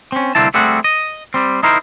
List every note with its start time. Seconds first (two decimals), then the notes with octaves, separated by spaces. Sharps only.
0.12 C4 C#4
0.35 C2 D3 A#3 C4 E4 A5
0.54 G3 A3 C4 F#4 G#4 F#5
0.84 D#5
1.34 G3 C4
1.63 D#4 E4 A#4 C5